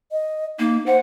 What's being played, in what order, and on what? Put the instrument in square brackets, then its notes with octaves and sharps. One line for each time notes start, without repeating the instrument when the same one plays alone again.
[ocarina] D#5
[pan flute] A#3 [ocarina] D#4
[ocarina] C5 [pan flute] F#5